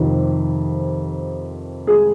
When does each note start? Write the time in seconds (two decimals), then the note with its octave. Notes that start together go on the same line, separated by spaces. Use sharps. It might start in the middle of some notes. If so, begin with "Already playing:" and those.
Already playing: F2 C3 D#3
1.87 G#4